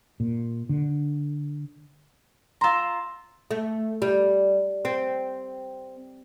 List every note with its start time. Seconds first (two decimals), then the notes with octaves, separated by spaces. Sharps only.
0.20 A#2
0.69 D3
2.61 F4 A#5 C6 E6 A#6
3.51 A3
4.02 G3
4.85 C4